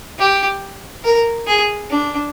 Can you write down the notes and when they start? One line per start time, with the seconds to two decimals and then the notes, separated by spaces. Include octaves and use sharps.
0.19 G4
1.04 A#4
1.47 G#4
1.90 D4